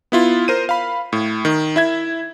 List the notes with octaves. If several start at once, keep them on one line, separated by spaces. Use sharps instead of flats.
B3 E4 F4
A#4 C5 D#7
F5 B5
A2
D#3
E4 E5 G#6